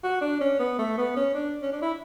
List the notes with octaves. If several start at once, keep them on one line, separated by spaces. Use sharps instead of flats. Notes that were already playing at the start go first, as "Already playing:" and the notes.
F#4
D4
C#4
B3
A3
B3
C#4
D4
C#4
D4
E4